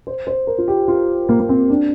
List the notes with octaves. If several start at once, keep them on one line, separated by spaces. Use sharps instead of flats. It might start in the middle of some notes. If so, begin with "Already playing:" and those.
C5
C5
A#4
F4
G4
F4
A#3
A#3
C4
D4